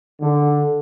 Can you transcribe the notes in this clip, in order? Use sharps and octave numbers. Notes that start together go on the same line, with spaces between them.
D3